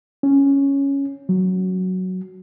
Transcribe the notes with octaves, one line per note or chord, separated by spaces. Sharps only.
C#4
F#3